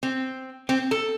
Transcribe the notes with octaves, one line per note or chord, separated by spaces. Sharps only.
C4
C4
A4